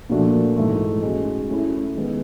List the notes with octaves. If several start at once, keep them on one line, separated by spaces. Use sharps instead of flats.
A#2 F3 A3 D4 F#4
G#2 E3 A3
G#3 C#4 F#4
A3 C#4 E4
D#3 G#3 B3